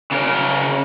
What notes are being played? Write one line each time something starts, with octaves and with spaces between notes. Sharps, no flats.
C#3 A#4